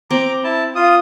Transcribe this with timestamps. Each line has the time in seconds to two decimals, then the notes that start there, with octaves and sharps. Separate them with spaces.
0.10 C4 A#5 D6
0.44 E4 A5
0.75 F4 D#6